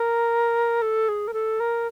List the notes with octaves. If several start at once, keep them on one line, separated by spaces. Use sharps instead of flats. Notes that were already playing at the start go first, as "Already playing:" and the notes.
Already playing: A#4
A4
G#4
A#4
A4
A#4